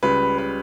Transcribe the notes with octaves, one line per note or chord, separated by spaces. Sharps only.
C#2 C#3 G3 B4
B4